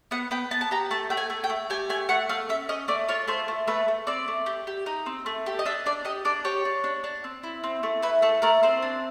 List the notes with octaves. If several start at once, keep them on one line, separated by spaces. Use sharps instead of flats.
B3 F#5
B3 G5
B3 A5
A5
G4 A#5
A3 A5
A3 G5
G#5
A3
G5
A3
G4 G#5
A3 G#5
A3 F#5
A3 F5
C#4 E5
C#4 D#5
A3 D5
F4 C#5
A3 C5
A3
A3 B4
A3
C4 D5
A3
G4
G4
D#4
C4
A3
G4
D#5
D4 E5
D4 D5
G4 D#5
D4 D5
G4 C#5
D4
D4
D4
C4
E4
C4
A3
E4 B4
A3 A4
A3 A#4
C4 C5
D4